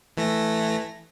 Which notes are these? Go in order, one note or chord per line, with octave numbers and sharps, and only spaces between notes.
E3 A3 A#6